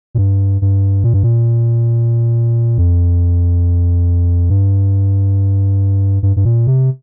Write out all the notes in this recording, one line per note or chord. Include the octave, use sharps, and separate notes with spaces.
A#2
G2
G2
A#2
G2
A#2
F2
G2
G2
G2
A#2
C3